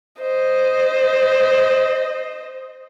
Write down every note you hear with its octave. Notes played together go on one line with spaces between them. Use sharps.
C5 D#5